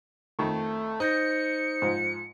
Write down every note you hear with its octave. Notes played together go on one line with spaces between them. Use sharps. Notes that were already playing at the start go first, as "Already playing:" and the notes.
F2 D#3 A3 C#6
D#4 C5 G6 A#6 C#7
G#2 F3